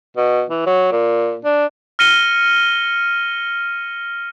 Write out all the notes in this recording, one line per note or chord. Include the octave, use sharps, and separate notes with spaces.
B2
E3
F#3
A#2
D4
F6 A#6 C#7 D#7 G7